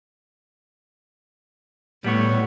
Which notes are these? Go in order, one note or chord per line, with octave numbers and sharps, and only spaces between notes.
A2 G3 B3 C#5